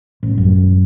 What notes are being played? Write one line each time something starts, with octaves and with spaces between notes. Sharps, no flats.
A1
F#2